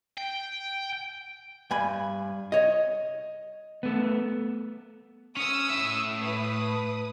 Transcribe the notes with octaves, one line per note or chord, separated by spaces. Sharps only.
G5
G2 G#5 B5
C#5 D#5
A3 B3
C#4 D#6 E6
A2 E5
B4 D#6